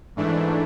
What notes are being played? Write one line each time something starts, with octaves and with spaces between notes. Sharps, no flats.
G#2 E3 A3 D4